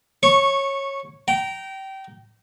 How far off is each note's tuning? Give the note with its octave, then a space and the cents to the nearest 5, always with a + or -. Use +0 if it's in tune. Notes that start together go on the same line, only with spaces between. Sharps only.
C#5 -15 C#6 +0
G5 -25 A#5 +0